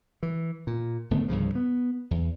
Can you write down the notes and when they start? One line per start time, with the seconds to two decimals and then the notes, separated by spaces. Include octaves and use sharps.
0.23 E3
0.67 A#2
1.11 G#1 D3 A3 B3
1.28 C2 G2 C#3 F3
1.55 B3
2.11 E2